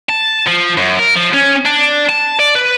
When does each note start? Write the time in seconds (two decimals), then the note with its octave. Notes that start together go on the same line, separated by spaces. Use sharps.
0.09 A5
0.47 F3
0.77 F#2
0.99 A#4
1.16 F3
1.34 C#4
1.66 D4
2.09 A5
2.40 D5
2.55 B4